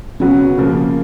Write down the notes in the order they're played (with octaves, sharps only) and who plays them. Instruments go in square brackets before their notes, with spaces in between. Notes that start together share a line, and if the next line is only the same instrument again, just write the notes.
[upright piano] C#3 F#3 B3 [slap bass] C#4
[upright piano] C#3 F3 A#3